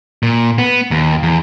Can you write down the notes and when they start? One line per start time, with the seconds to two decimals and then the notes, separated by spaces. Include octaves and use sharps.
0.23 A#2
0.58 B3
0.91 D#2
1.23 E2